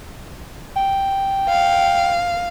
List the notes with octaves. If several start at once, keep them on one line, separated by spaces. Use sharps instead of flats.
G5
F5